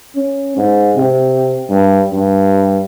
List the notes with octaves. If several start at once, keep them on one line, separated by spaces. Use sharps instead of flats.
C#4
G#2
C3
G2
G2